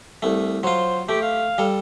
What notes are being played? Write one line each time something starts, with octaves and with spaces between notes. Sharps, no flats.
C2 A3
F#3 F4 C5
A3 G4
F5
G3 A4